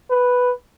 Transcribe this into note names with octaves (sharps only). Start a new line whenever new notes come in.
B4